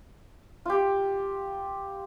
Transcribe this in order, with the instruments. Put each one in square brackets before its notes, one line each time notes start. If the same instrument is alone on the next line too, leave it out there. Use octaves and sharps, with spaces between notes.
[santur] F4 G4